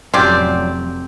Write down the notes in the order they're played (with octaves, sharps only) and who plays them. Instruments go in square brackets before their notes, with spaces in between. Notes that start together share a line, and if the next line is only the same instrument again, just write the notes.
[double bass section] F1 A2 F#3 [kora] C4 G4 [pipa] C#4 F4 D5